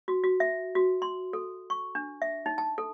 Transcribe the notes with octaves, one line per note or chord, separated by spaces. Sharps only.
F#4
F#4
E5
F#4
C6
A4
C#6
D4
E5
D#4
A5
A4